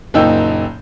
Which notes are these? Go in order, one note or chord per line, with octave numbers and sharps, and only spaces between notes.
F#1 A#2 D#4 G5 E6 G6